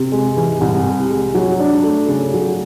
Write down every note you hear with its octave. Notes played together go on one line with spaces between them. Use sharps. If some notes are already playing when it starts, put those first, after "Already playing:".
Already playing: C3
G#3
E3
C2
C3
G#3
F#3
D4
A3
C#3
F#3